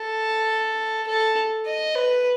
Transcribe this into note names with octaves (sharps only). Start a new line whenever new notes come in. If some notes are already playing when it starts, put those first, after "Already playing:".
Already playing: A4
A4
D#5
B4